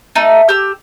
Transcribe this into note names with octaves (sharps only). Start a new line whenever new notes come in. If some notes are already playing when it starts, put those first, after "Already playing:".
A3 D#4
G4 E6